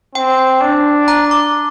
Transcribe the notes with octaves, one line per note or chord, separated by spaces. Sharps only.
C4 G5
D4
A#5
D6